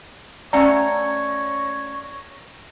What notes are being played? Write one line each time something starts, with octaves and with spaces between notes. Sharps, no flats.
A3 C#4 C#5 D5 F#5 A#5